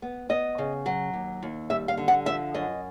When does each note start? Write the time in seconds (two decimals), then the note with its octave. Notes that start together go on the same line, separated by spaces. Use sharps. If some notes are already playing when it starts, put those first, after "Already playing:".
0.02 B3
0.29 B3 D#5
0.58 C#3
0.86 F#3
1.13 D#2
1.43 D#2
1.70 G3 E5
1.88 F5
1.97 D3
2.08 F#5
2.26 F3 E5
2.54 F#2 D#5